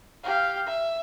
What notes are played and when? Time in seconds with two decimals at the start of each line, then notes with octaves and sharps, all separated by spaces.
0.24 G4 F5
0.66 E5